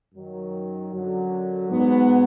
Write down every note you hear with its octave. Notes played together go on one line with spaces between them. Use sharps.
F#2 D#3 F#3
F#2 D3 F#3
G#2 F#3 B3